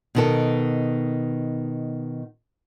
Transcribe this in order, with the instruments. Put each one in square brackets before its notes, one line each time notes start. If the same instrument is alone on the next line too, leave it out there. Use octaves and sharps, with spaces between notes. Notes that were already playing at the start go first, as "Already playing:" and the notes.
[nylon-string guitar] B2 D#3 A4